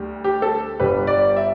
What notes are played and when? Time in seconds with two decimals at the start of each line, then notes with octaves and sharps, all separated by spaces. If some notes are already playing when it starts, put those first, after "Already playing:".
Already playing: D2 D3 G3
0.24 G4
0.42 A4
0.80 G1 G2 G3 B4
1.07 D5
1.37 E5